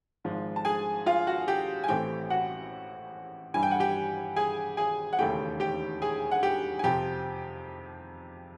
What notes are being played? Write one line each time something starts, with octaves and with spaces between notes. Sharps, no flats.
G#1 G#2 F3
A5
G#4 G#5
F4 F5
F#4 F#5
G4 G5
G#5
A1 A2 E3 A3 C4 G4 G5
F#4 F#5
G2 E3 G3 G#5
G5
F#5
G4 G5
G#4 G#5
G#4 G#5
F#5
E1 D#2 C#3 E3 A3 G4 G5
G4 G5
G#4 G#5
F#5
G4 G5
G#5
F2 C3 F3 G4 G5